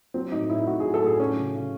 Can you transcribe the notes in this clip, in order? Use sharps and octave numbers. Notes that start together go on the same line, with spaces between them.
F#3 C4
A2 D#4
A2 E4
A2 F#4
G#4
F#3
A4
A2 G#4
F#3 C#4
C#3
C#3